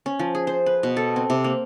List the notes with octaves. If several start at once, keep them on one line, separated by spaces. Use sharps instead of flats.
C#4
F3
G#4
C5
B4
B2
A4
C4
C3
A#3